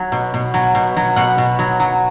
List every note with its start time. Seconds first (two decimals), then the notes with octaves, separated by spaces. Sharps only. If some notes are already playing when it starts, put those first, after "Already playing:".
Already playing: F#3
0.12 B2
0.34 B2
0.54 F#3
0.75 B2
0.97 F#3
1.16 B2 F#5
1.38 B2
1.59 F#3
1.80 F#3